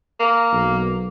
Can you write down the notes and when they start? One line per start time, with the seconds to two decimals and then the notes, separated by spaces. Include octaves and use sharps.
0.19 A#3
0.52 B1